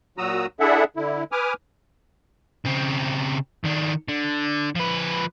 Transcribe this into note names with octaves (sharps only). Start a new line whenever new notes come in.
A#2 F#3 F#4 A#5 D#6 E6
D4 E4 G#4 A4 E5 F#5
D3 E4
B4 G#5 D6 D#6 F6
C#3 C4
D#3 D4
D3
F3 B4